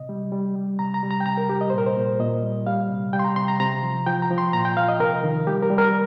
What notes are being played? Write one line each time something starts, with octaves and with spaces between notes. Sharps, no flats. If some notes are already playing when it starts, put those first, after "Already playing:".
Already playing: C3 D#5
G3
G3
G3
C3 A#5
A#5
G3
A#5
G5
C3 A#5
A#4
G3 G4
D#5
C5
A#2 A#4
C5
A#2
A#2 D#5
G3
G3 F5
C3
G3 G5
C6
A#5
C3 C6
A#5
C3 A#5
F3
F3 G5
A#5
F3
C6
A#2 A#5
G5
F3 F5
D#5
C3 A#4
D#3
G3 G4
A#4
G3
A#4